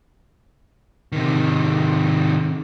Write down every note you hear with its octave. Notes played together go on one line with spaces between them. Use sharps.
C3 D#3